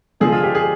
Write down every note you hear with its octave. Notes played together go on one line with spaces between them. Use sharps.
D3 F3 G#3 D4 G#4
F4
G4
G#4